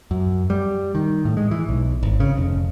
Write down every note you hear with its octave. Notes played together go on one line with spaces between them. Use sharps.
F#2
G3
D#3
A2
G#3
E3
B1
G#1
C#3
F1